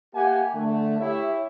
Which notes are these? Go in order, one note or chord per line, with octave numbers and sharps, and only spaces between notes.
A#3 G4 E5 F#5 G#5
D3 A3
E4 G4 C#5 E5